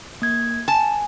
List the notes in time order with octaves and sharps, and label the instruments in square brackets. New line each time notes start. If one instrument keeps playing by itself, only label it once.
[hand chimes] A#3 G#6
[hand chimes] G#5 [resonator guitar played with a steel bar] A5